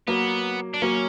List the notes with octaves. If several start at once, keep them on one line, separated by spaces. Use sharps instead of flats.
F#3 A#3 B3
D4
F#3 A#3 C#4